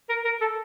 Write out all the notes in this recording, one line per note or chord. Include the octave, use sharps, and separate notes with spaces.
A#4
A#4
A4